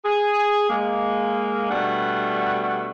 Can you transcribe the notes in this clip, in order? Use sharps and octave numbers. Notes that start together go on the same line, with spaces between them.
G#4
G#3 A#3
B2 G3 A3 D4 F#5